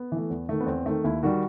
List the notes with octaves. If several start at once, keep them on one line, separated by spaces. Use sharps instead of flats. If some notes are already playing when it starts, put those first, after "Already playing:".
Already playing: B3
E3 A3
E2
D#3 A3
B3
E2 C4
D#3 A3
D#2 E4
D#3 G3 F#4